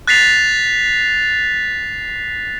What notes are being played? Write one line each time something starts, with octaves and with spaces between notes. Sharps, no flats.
F#6 A6 B6 C7 F7